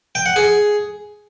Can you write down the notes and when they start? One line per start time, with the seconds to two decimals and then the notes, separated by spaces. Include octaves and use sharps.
0.15 G5
0.26 F#5
0.36 G#4